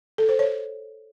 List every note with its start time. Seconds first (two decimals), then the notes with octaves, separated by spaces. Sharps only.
0.18 A4
0.29 C5
0.39 C#5